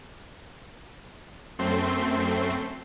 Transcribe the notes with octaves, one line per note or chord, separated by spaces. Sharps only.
F#2 A3 C4 C6